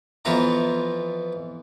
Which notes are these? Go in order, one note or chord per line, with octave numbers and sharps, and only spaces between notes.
F2 E3 B3 F4 E5 A#5